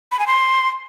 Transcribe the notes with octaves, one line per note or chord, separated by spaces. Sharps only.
B5
G#5
C6